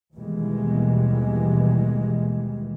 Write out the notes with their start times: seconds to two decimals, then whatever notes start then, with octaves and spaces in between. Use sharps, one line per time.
0.14 D#2 B2 E3 G3 G#3